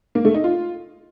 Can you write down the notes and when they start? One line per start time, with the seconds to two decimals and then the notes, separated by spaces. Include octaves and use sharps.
0.15 A#3
0.25 A3
0.34 D#4
0.44 F4